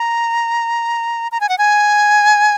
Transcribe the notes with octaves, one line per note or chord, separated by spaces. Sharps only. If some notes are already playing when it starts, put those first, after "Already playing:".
Already playing: A#5
A#5
G#5
F#5
G#5